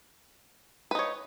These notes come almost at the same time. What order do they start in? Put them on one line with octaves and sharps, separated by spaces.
B4 D#4 C#5